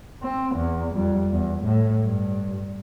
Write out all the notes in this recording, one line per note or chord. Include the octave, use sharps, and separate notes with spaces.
C4
E2
F2 G3
E2
A2
G2